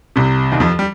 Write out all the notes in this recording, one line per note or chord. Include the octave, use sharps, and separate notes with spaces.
C2 C3
D#2 D#3
F2 F3
G3